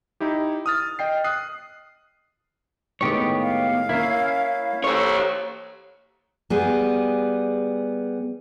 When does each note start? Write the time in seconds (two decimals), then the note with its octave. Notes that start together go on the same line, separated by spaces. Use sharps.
0.20 D#4 E4 G4
0.66 D#6 F6 A6
0.99 D#5 G5 C7
1.24 D#6 F#6 C7
3.01 A2 D#3 G#3 B3 G4 C#5
3.40 F5
3.89 A#3 C#4 E4 A#4 E5
4.84 G4 A4 C5 C#5
6.50 G3 B3 G#4